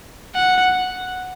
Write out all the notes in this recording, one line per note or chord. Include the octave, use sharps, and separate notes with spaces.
F#5